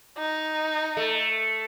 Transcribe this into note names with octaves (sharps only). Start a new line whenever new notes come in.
D#4
A3